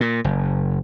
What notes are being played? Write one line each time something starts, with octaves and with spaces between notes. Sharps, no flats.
A#2
F#1